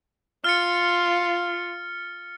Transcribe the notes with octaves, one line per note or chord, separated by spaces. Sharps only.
F4 F6 A6 C#7